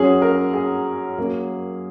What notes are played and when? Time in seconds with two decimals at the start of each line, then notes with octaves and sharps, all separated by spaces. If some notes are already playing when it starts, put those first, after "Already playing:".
Already playing: F#2 F#3 C#4 G#4
0.22 A#4
0.54 G#4
1.18 F#2 F#3 A#3